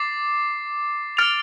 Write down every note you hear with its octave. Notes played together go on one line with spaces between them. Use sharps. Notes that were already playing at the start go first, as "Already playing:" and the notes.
Already playing: D6 A6 C7
F6 A6 D7 F7